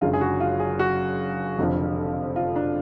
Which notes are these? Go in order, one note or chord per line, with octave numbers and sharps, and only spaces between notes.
F#1 F#2 D3 G#3 F4
G#4
F#4
F4
G#4
F#4
F1 F2 D3 F3
F4
D4